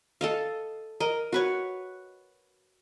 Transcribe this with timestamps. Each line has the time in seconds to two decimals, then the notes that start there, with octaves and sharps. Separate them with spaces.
0.21 A4 D#5 F5
1.00 A#4 D#5
1.32 F#4 B4 C#5